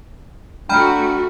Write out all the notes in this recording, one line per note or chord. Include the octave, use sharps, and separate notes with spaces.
A3 D4 F#4 G5 A#5 B5 F6